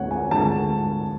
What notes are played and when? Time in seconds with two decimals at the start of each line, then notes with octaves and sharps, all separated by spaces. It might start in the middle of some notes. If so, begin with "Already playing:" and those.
Already playing: D2 D3 G#3 C#5 F#5
0.11 G#5
0.31 D2 D3 G#3 A5